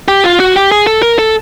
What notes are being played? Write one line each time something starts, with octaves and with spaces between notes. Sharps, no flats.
G4
F4
F#4
G4
G#4
A4
A#4
A4